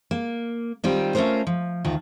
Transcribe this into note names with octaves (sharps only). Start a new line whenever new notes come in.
A#3
D#3 G3 C4 F4
A3 C#4 F4 A#4 C5
F3
D2 D#3 F4